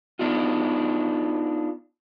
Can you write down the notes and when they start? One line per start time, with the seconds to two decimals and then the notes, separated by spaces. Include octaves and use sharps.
0.19 B3 D4 D#4 F4